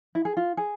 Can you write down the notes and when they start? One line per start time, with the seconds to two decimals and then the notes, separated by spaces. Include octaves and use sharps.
0.15 E4
0.25 G#4
0.37 F4
0.57 G#4